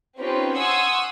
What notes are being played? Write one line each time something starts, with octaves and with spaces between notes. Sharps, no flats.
C4 C#4 D#4 F4 G4 B4
F#5 G#5 C6 C#6 D#6 E6